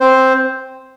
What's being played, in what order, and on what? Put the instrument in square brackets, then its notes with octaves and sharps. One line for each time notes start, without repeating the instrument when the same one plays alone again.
[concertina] C4 C5